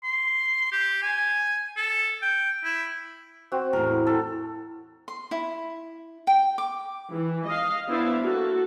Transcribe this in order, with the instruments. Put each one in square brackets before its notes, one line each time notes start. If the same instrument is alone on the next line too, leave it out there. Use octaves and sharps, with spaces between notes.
[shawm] C6
G4
G#5
A4
G5
E4
[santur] C4 F#4
[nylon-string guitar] E2 A2 [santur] A#4
[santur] A4
[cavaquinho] C6
E4
G5
D6
[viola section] E3
D#5 F5
B3 D4 E4 C5 E5 F5
A#3 F#4 A4